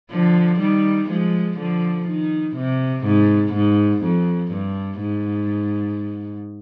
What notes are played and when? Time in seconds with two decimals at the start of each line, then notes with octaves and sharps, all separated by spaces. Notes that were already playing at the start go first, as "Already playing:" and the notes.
0.11 D3 F3
0.59 D#3 G3
1.09 F3 G#3
1.58 D3 F3
2.07 D#3
2.56 C3
3.04 G#2
3.53 G#2
4.02 F2
4.52 G2
5.00 G#2